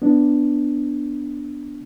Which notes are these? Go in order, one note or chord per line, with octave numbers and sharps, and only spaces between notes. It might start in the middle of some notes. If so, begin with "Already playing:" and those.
B3 D4